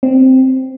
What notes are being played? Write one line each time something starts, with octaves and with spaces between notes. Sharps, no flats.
C4